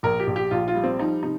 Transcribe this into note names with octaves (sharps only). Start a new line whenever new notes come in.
A#1 A#4
G4
A#1
G4
A#1 F4
F4
G3
C4
F3 D#4
C3 D#4